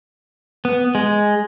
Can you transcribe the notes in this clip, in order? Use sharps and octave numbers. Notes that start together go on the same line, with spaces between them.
B3
G#3